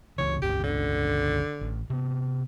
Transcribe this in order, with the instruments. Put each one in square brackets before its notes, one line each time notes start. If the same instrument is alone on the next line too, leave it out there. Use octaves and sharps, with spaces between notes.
[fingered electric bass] C#2 C#3 E3 [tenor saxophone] C#5
[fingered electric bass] G1 C#2 C#3 [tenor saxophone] G4
[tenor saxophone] D3
[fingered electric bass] A1
C3 B3